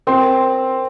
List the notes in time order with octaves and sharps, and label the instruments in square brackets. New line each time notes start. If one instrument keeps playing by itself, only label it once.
[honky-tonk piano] C4 [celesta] A#4 G5 C6